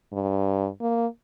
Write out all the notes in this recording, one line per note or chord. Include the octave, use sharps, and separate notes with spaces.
G2
A#3